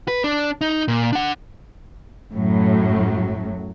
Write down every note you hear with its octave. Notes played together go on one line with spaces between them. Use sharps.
B4
D4
D#4
A#2
D4 F#5
F#2 A2 F#3